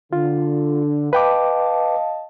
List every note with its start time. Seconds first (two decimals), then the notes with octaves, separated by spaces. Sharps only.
0.13 D3 F4
1.13 B4 D#5 F5 G5 A5 D6